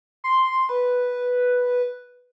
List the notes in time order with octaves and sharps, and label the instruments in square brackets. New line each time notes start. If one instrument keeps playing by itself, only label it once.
[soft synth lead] C6
B4